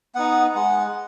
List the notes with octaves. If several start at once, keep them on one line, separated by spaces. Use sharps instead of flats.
B3 D#4 F#5
G#3 F#5